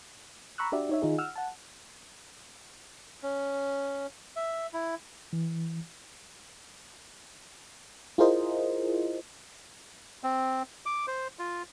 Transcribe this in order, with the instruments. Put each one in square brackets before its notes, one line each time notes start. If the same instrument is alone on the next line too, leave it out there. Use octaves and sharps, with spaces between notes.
[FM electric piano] A#5 B5 C#6 E6 F#6
D4 F#4 G4 D5 E5
D#4 C#5 E5
D#3 D#4 F4 G#4
F#5 E6 F6
F#5 A5
[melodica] C#4
E5
E4
[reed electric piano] E3
[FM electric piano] E4 F4 G#4 A#4 C5 D#5
[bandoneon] C4
D6
C5
F4